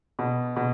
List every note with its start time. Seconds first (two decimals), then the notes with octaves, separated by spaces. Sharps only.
0.19 B2
0.56 B2